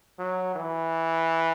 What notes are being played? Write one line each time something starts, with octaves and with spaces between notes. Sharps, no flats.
F#3
E3